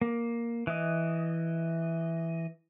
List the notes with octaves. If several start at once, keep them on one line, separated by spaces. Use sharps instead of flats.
A#3
E3 D#5